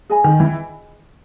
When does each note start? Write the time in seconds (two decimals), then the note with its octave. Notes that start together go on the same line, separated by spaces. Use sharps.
0.10 G#4 D#5 G#5 B5
0.24 D#3
0.40 E3